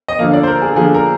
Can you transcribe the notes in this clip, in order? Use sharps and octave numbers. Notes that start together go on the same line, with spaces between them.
D#5
D3 F3 A#3 F5
D5
C5
A#4
G#4
D3 F3 A#3 G#4
A#4